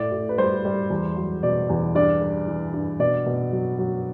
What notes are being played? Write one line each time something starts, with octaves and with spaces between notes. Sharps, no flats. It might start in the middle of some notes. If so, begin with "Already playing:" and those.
Already playing: A2 D5
A2
B4
G3 C5
G3
E2
F#3
B2 D5
E2
G2 D5
G3
E3
G2
B2 D5
B2
F#3
F#3